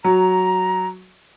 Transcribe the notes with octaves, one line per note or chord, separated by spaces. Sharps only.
F#3 A#5